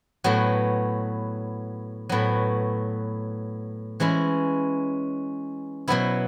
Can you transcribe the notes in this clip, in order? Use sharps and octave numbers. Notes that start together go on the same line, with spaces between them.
A2 F#3 B3 F#4
A2 F#3 B3 F#4
E3 G#3 C#4 E4
B2 F#3 B3 E4